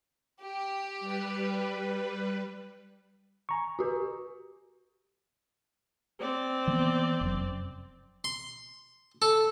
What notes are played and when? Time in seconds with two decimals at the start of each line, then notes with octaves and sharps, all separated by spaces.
0.43 G4
1.00 G3 B4
3.49 G#5 A#5 C#6
3.79 F#4 G4 B4
6.20 C4 D5
6.67 E3 A#3 B3
7.21 F1 F#2
8.24 C6
9.22 A4